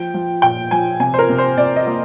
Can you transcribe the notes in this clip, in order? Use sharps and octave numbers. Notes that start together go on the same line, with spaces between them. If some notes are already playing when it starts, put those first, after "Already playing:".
Already playing: F3 G5
F3
A#2 G5
F3 G#5
C3 G#5
C5
A#4
C3
C5
C3 D5
D#5
A#3